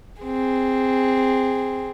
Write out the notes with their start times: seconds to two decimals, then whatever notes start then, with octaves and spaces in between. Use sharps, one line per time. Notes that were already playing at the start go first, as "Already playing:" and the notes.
0.23 C4 G#4